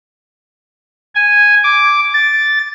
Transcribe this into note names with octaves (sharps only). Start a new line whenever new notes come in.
G#5
D6
A6